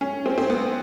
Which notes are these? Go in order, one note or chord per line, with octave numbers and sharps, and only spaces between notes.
C#4
C4
C4
B3